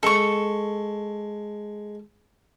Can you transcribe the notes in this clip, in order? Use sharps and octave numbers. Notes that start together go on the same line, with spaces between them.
G#3 A4 C#6